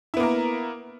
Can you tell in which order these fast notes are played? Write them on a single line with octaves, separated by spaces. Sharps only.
E4 B3 A#3 A#4